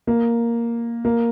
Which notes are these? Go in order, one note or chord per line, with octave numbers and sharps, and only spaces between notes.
A#3
A#3